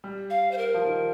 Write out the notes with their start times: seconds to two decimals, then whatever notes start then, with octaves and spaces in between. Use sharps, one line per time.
0.04 G3
0.30 F5
0.51 C5
0.58 A#4
0.74 F3
0.85 D#3